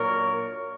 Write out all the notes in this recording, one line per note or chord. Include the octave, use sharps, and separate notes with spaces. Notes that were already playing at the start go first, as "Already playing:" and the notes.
Already playing: A#2 F#3 A#3 D4 A#4 C#5